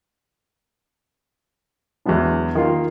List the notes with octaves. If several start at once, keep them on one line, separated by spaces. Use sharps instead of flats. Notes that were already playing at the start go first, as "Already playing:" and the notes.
E2 F#3 G#3 B3 D4
D#3 A#3 F4